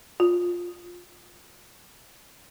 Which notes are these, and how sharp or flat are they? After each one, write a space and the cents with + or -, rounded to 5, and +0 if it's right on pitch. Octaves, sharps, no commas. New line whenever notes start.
F4 +10